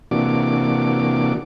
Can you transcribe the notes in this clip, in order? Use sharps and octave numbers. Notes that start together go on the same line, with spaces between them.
C3 E3 A#3 D4 F#4 D6